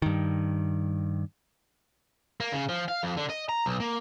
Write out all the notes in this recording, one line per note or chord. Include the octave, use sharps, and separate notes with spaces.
G2 D#3
A#3
C#3
F3
F5
F2
D3
D#5
A#5
B1
A#3